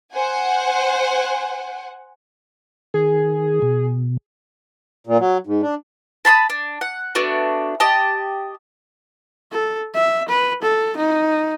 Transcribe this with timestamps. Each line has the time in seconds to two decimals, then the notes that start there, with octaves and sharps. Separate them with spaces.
0.13 C5 F#5 G#5
2.94 D#3 G#4
3.62 B2
5.07 A#2
5.20 F#3
5.47 G#2
5.62 D4
6.25 A5 B5 C6 D#6
6.50 D4
6.81 F#5
7.15 A3 B3 D4 F#4
7.80 G4 D#5 A5
9.52 A4
9.94 E5
10.29 B4
10.62 A4
10.97 D#4